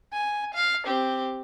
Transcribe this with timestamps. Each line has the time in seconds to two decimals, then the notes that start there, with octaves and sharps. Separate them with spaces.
0.13 G#5
0.54 F5
0.85 C4 G4